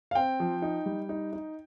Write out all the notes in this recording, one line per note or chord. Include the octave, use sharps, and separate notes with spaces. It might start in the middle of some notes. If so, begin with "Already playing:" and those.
F5
C4 G5
F3
D#4
G3
D#4
D#4